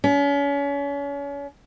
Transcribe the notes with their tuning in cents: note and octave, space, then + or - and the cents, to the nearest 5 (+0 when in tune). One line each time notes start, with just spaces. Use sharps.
C#4 +35